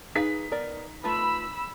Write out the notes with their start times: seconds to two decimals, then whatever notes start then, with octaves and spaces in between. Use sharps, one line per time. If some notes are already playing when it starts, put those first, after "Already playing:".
0.15 D#4 G#4 B4 F5 B6
0.52 B3 A#4 D5
1.04 A3 F4 B4 B5 E6